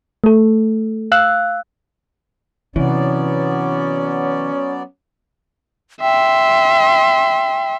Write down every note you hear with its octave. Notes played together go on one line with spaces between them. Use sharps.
A3 A4
F5 E6 F#6
C3 E3 F#3 B3 C#4 D5
E5 G5 C6